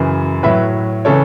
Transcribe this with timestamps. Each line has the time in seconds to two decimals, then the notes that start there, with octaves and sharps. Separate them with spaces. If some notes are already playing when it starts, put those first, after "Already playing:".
Already playing: F#2 C#3 E3
0.43 A2 F#3 B4 E5
1.05 C#3 E3 A4 C#5